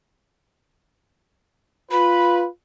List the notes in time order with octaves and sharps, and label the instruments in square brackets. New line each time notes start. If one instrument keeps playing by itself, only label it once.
[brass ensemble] F4 B4 [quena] B5